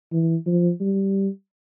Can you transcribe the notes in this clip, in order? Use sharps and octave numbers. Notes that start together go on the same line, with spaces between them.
E3
F3
G3